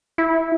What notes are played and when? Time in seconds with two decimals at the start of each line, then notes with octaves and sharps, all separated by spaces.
0.18 E4